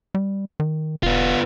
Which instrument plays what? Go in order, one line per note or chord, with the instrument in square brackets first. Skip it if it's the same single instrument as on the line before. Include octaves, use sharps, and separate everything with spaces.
[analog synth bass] G3
D#3
[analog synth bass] E1 [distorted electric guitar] B3 F4